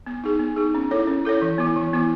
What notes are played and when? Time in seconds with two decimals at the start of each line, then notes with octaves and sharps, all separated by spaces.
0.06 B3
0.24 D#4 G#4
0.39 B3
0.56 D#4 G#4
0.75 C#4
0.91 E4 A4 C#5
1.07 C#4
1.25 E4 A4 C#5
1.42 E3
1.58 B3 E4
1.76 E3
1.93 B3 E4